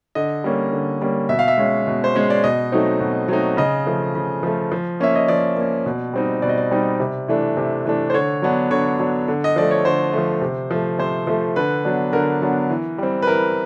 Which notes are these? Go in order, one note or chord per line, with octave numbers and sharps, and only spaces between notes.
D3 D#5
G3 A#3 C#4
D3
G3 A#3 C#4
B2 E5
F5
E5
G#3 C#4
B2
C5
G#3 C#4 C#5
D5
B2 D#5
F#3 A3 C4 D#4
B2
F#3 A3 C4 D#4
C#3 D#5
F3 A3
C#3
F3 A3
F3
A#3 C#4 E5
D#5
F3 D5
A#3 C#4
B2
G3 C4 D#4
B2 D5
D#5
D5
G3 C4 D#4
C3
E3 A3 D4
C3
E3 A3 D4
C5
D3 C#5
F#3 B3 D4
D3 C#5
F#3 B3 D4
D3
D#5
F3 A3 D5
C#5
D3 C5
F3 A3
C3
F3 A3
C3 C5
F3 A3
D3 B4
F#3 B3 D4
D3 A#4
F#3 B3 D4
E3
G3 C4
B4
E3 A#4